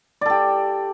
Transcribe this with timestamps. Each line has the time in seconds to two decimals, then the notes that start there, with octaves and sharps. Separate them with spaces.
0.21 D5
0.26 A4
0.30 G4